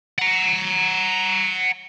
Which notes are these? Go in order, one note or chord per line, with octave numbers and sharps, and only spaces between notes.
F#5 A#5